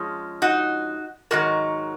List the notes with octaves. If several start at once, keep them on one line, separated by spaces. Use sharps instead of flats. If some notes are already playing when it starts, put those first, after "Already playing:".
Already playing: F3 G#3 C#4
D#4 F#4
G#2 D#3 F#3 F#4 A#4